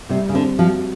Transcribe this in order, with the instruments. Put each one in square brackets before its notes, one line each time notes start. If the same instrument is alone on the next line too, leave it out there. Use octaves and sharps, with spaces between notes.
[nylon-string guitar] C3 [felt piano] G3
[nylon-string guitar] C#3
[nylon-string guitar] D3 [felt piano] C4
[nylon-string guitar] F3 [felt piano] F#4